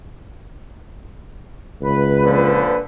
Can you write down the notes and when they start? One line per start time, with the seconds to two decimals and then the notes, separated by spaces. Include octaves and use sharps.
1.81 C#2 B4
2.22 A#2 D3 F3